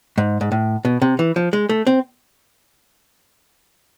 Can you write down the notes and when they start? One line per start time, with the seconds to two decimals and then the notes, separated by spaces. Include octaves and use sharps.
0.18 G#2
0.41 G#2
0.52 A2
0.85 B2
1.02 C3
1.19 E3
1.36 F3
1.53 G#3
1.69 A3
1.87 C4